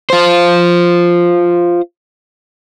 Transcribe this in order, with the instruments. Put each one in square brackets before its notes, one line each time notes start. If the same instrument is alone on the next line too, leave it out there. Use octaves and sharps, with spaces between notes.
[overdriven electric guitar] F4 C5